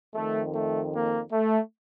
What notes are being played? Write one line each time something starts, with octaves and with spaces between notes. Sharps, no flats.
F2 D#3 A3
A3
A#3
A3